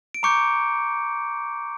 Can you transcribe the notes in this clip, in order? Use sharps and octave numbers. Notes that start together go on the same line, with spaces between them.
D7
A#5 C#6 D6 G6 C#7